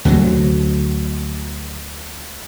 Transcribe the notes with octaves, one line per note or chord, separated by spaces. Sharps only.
D2 D3 E3 F#3